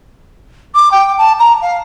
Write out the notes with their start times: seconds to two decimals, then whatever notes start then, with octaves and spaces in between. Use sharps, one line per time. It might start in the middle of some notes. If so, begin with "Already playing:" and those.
0.74 D6
0.91 G5
1.18 A5
1.39 A#5
1.61 F5